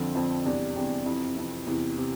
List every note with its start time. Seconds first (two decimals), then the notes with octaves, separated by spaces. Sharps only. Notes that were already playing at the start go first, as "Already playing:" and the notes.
Already playing: F2 D3 F3 C4
0.15 F2 D3 F3 C4
0.45 E2 C3 G3 D4 G4
0.76 E2 C3 G3 D4 G4
1.06 F2 C3 E3
1.36 F2 C3 E3
1.66 E2 C3 E3
1.97 C3 E3